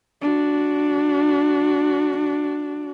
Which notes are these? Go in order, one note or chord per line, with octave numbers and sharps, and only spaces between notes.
D4 F#4